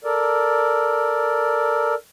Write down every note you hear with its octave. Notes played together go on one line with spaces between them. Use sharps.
A4 A#4 D5